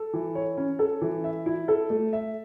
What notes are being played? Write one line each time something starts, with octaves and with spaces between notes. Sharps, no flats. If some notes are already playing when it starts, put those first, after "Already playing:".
Already playing: A4
E3
C#5
C#4
A4
E3
E5
E4
A4
A3
E5